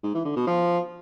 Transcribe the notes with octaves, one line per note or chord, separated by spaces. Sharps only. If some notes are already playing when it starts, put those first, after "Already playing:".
G#2
E3
D3
B2
F3